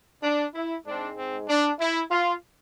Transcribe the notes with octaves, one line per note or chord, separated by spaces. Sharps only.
D4
E4
G#2 G#3 C4 D4
C4
D4
E4
F4